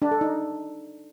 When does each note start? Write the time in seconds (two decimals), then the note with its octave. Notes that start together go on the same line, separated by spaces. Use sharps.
0.02 D4
0.11 A4
0.21 D#4